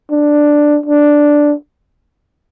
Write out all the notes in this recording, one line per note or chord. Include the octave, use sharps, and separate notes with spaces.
D4
D4